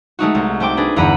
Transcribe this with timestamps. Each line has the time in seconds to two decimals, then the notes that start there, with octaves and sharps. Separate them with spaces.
0.19 G#3 A3 D#4 F#4
0.35 C2
0.60 A3 C4 G5 D6
0.77 D4 G#4 B4
0.96 G1 E2 F#5 A#5 B5 D#7